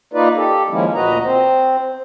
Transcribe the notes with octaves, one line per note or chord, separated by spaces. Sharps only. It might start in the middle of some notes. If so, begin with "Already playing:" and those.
A#3 D#4 F4 B4 D5
G4 A4
D#3 F3 G#3 A#3 C#4 E4
D2 A#2 F#4 B4 D#5 A#5
C4 C5